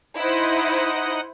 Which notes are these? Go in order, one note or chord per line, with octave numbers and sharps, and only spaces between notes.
D#4 E4 C5 D#5 F#5